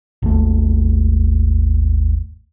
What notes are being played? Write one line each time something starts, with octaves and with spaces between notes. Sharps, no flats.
G#1 D#2 A3